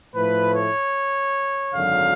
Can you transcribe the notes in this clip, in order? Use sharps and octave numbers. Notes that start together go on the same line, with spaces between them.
A2 F3 A3 B4
C#5
G#1 F#2 D3 F#3 F5